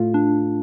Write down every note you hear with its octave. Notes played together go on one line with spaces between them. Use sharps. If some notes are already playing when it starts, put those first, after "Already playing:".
Already playing: A2 A3 F4
D4